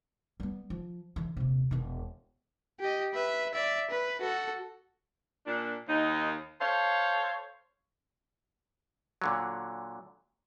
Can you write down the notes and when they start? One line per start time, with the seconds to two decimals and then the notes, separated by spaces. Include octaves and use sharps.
0.40 G3 B3
0.70 F3
1.16 D3 E3
1.37 D#1 C3
1.71 E1 B2
2.80 G4 D#5
3.14 B4 E5
3.54 D5 E5
3.91 B4
4.21 F#4 A4
5.46 A#2 D4
5.89 D#2 D#4
6.60 A4 C5 C#5 F5
9.22 A#2 D3 F#3